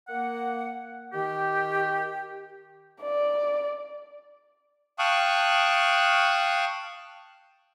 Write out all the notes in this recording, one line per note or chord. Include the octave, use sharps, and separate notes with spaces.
A#3 F#5
D#3 G4
D5
F5 G5 A5 C#6 D#6 F#6